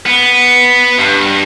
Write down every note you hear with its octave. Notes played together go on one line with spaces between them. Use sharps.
B3
G2